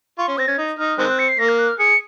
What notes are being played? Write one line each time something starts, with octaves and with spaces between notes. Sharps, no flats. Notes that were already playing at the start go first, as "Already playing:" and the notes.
F4 C#6
C#4 C6
C4 A#6
C#4 G#6
D#4
D#4 F6
D#3 G#3 C4 F#6
F#6
C#7
C7
A#3 A#6
F6
F#6
F6
G#4 C#7